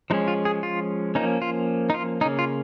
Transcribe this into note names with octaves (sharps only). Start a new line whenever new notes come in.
F3 G#3 C#4 D#4
F4
G#4
F4
F3 A#3 C#4 D#4
F4
D#4
F4
C#3 A#3 C#4 D#4
F4